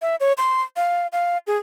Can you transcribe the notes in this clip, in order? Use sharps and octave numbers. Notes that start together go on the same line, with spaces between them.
E5
C#5
C6
F5
F5
G#4